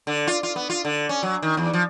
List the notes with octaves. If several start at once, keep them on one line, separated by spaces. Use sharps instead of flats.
D3
F4
F4
B3
F4
D3
C#4
F#3
D#3
E2
F3